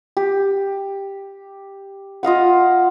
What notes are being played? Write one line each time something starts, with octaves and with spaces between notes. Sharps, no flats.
G4
F4 D#5 F5 F#5